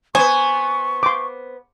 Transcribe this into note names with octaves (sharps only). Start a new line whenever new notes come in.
B3 C5 G#5 C#6 D#6
C6 D6